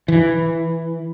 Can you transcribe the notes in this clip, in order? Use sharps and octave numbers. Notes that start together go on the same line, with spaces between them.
E3